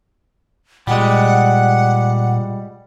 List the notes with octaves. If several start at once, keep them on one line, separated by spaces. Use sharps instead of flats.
A#2 G3 G#3 F#5